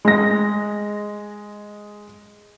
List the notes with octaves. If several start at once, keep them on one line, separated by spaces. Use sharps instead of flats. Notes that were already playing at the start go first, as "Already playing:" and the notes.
G#3 A#6